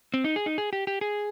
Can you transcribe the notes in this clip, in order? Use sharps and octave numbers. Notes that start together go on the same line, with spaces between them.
C4
D#4
G#4
D#4
G#4
G4
G4
G#4